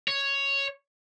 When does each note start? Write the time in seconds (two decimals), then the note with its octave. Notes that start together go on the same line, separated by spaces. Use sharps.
0.08 C#5